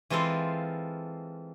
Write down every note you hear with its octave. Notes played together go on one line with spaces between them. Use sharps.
E3 G#3 C4 F4 A4 F5